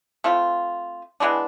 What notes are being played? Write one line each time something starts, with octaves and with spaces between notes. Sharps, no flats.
A3 C4 F4
E3 G#3 B3 D4